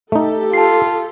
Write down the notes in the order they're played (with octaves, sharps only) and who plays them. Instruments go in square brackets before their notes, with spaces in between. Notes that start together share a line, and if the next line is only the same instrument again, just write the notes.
[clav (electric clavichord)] A3 D#4 [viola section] G4 A4
[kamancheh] F4 [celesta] A5 C7